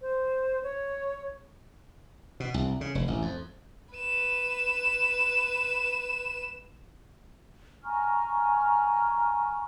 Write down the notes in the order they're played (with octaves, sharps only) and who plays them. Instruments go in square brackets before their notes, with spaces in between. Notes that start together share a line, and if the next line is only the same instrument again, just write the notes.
[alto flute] C5
C#5
[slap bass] B2
C2
C#3
F1
A1
F2
[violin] B4 E7
[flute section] G#5 A#5 C#6 F6